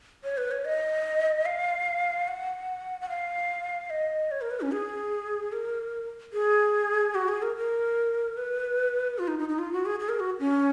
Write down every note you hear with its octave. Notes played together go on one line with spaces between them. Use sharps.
C#5
B4
C#5
D#5
F5
F#5
F#5
F5
D#5
C#5
A#4
B4
C#4
G#4
A#4
G#4
F#4
G#4
A#4
A#4
B4
F4
D#4
D#4
D#4
F4
F#4
G#4
G#4
A#4
F#4
C#4